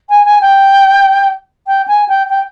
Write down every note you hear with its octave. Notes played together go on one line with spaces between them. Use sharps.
G#5
G#5
G5
G5
G#5
G5
G5